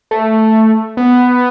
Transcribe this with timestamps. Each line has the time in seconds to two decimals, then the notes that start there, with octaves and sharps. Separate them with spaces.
0.11 A3
0.97 B3